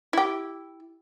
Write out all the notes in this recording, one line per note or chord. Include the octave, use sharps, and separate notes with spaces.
E4 G4